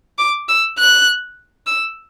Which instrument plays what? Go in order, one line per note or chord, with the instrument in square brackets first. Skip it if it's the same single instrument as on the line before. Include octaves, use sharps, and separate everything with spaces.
[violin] D6
E6
F#6
E6